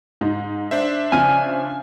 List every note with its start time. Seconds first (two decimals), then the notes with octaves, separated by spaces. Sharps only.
0.21 G#2 D#4
0.71 D4 C5 E5
1.12 C#3 F3 G#5 F6